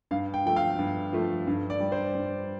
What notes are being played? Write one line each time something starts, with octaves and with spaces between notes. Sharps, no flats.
G2 F5
G5
F3 A3 G5
F5
G2
F3 A3
G2
D5
G3
C5
G2